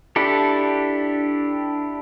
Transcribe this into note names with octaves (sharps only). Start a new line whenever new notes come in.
D4 E4 G4 A4